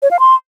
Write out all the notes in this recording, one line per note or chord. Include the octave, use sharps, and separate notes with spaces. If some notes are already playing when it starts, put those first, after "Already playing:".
C#5
F5
C6